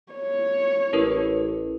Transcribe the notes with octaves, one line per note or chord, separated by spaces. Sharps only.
C#5
A1 E4 A#4 B4